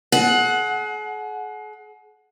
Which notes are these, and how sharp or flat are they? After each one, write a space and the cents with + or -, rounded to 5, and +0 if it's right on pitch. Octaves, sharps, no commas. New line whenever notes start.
G#4 +40 F#5 -5